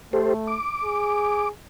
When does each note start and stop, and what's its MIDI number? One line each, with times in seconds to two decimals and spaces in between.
0.13 0.57 57
0.13 0.34 67
0.13 0.34 69
0.13 0.34 72
0.47 1.49 86
0.84 1.50 68